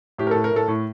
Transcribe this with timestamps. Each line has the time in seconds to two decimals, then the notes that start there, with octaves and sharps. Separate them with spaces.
0.18 A2 G4
0.27 A#4
0.31 A2 A4
0.44 A#4
0.52 A2 A4
0.68 A2